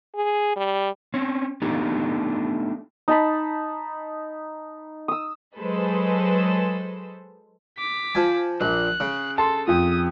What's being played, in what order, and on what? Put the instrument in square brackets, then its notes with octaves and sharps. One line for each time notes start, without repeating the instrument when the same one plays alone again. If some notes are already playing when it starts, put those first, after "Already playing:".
[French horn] G#4
G3
[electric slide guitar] C4 C#4
A3 B3 D4 D#4 G4
[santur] D#4 A5 B5
D#6 E6
[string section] F#3 G#3 A4 B4 C5
[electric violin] D6 B6
[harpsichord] F3 G#5
[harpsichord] A#1 [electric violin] F#6
[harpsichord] C#3
[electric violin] A4 [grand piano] A5 C6
[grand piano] F2 F3 [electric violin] D#6